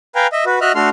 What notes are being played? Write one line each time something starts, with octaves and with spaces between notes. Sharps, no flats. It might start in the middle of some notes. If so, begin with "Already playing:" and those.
B4 F5 G5 G#5 A#5
D#5 E5
F#4 B4
F#4 D#5 E5 F6 F#6
A3 D4 F#4 A4 C6 F6